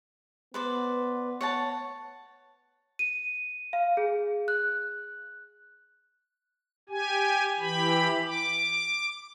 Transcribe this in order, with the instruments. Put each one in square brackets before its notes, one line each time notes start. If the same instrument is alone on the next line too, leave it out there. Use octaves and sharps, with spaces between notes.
[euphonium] B3 [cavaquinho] B4 C5 D5
[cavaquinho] C#5 F#5 A5
[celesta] D#7
F5
G#4
F#6
[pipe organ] G4 G#5
E3 G4 B5
D6